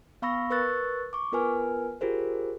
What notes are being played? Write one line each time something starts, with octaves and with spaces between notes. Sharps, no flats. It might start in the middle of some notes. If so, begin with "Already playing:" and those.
B3 F5 B5 C#6 E6 A#6
A#4 B4 C#6 E6 F#6 A6
C#6 D6
B3 F4 A#4 B4 G#5 F6
F4 G4 G#4 A#4 C5